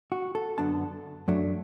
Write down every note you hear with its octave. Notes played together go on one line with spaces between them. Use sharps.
F#4
A4
F#2 D3 B3 D4 A5
F#2 F#3 A3 D4